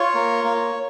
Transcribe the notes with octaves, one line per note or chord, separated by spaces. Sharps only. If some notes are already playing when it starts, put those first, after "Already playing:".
Already playing: F4 C#5
A#3
A#3